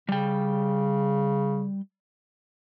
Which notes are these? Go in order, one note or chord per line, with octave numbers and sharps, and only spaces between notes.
C#3 G3 G5